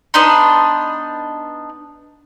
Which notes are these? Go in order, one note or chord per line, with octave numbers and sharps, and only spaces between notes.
B3 D4 D#4 C6